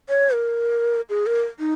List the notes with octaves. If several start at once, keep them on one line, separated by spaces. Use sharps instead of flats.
C#5
A#4
G#4
A#4
D#4